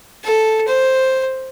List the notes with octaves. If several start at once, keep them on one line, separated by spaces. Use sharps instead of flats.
A4
C5